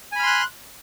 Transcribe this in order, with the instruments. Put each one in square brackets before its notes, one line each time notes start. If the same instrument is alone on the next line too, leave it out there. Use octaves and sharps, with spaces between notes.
[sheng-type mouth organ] G#5
B5
F6
C6
F#6